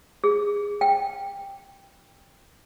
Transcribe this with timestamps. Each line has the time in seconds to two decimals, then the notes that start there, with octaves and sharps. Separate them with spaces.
0.24 G#4
0.81 G5